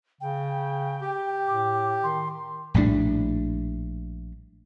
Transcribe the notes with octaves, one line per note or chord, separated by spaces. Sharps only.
C#3 G5
G4
A2 D6
D#3 C6
A#1 A2 G3 D4